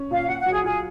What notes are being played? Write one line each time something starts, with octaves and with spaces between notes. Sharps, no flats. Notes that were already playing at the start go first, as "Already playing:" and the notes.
Already playing: C#4
A#2 F5
A#2 F#5
F#5
F#3
G#4
F4 G#4